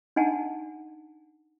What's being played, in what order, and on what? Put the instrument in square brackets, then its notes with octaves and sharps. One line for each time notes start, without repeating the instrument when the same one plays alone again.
[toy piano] D4 D#4 F#5 G#5 A5